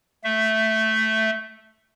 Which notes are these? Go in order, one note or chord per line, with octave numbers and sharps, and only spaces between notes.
A3 E5